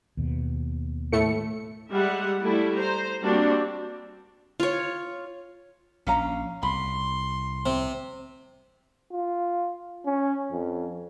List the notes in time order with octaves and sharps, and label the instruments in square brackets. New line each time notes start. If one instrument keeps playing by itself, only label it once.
[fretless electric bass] D#2 B2
[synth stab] A2 A3 C#7
[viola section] G3 G#3 E5 F#5
G3 A3 E4 A4
C5 A#5
G3 A#3 C4 D4 F#4
[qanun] F4 C#5
[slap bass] A#1 [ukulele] C#4 F5 A#5
[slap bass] C2 [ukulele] B5 [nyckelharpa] C6
[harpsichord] C3
[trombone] F4
C#4
F2